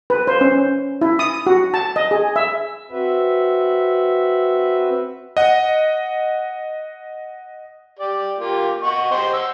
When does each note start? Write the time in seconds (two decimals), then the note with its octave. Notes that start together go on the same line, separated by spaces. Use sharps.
0.10 B4
0.27 C5
0.41 C#4
1.01 E4
1.19 D#6
1.46 F#4
1.74 A5
1.96 D#5
2.11 G#4
2.36 E5
2.91 C4 F#4 B4 E5
5.37 D#5 F#5
7.99 G4 D5
8.39 A#3 F4 G4
8.83 D#5 F#5 C#6
9.11 G4 C5 D#5
9.33 F#5 E6